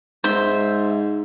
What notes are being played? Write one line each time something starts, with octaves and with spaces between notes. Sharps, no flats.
G#2 C5 E5